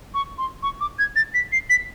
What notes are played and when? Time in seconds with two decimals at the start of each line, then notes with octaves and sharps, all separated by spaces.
0.14 C#6
0.38 C6
0.63 C#6
0.81 D6
0.99 G#6
1.16 A6
1.34 B6
1.52 C7
1.70 B6